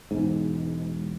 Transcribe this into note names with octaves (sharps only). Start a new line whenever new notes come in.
E1 G#2